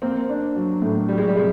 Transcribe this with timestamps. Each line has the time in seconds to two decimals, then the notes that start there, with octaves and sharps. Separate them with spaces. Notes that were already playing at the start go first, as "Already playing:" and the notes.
0.02 A#3 C4
0.29 D4
0.55 F#3
0.82 A2
1.08 F#3 G3
1.18 G#3
1.28 G3
1.36 C3 G#3